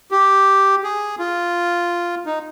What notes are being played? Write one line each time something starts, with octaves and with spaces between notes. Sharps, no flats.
G4
G#4
F4
D#4